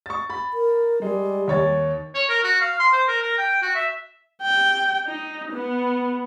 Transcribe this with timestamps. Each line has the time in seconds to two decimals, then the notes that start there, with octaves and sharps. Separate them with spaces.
0.06 C#6 A6
0.30 B5 A6
0.54 A#4
1.02 G3 G#3
1.48 D#2 C#5 A6
2.15 C#5
2.29 A#4
2.43 F#4
2.61 F5
2.79 C6
2.93 C5
3.08 A#4
3.22 A#4
3.38 G5
3.62 F#4
3.75 E5
4.42 G5
5.07 D#4
5.53 B3